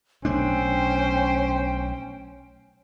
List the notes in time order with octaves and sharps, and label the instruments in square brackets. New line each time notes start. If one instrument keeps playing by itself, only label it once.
[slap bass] B1 A3 D4 [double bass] C#4 [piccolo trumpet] C5 [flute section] G5